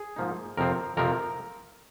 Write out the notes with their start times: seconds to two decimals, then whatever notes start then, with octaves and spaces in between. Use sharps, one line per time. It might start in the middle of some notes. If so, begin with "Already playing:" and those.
Already playing: G#4
0.16 G#2 F3 A#3 D#4
0.57 F2 C3 F3 C4 A#4
0.97 F2 C3 F3 C4 A#4